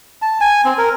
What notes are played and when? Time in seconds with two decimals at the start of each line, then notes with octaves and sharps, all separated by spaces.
0.22 A5
0.41 G#5
0.65 C4
0.78 A#4